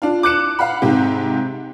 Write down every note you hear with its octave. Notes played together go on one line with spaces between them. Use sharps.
D4 F4
D6 F#6 C#7 E7
F5 F#5 B5
G#2 C3 G4